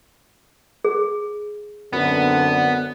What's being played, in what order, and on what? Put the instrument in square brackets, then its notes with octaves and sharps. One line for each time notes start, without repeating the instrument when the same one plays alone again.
[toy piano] G#4
[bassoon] F#2 [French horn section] D3 C4 B4 [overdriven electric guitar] B3